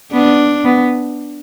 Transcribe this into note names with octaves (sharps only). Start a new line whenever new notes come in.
B3 D4
B3